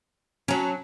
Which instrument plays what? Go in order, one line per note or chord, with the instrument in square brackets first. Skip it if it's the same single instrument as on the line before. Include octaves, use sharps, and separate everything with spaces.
[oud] F#3 C#4 [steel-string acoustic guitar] A5 A#5